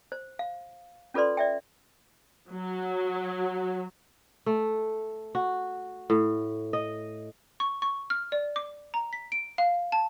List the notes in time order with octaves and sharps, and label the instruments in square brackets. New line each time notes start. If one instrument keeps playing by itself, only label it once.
[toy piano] C5
F5
C#4 F4 A4 B4 D5 C6
D5 E5 G5
[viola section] F#3
[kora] A3
F#4
A2
D#5
[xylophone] C#6
C#6
F6
D5
D6
A#5
B6
D7
F5
A5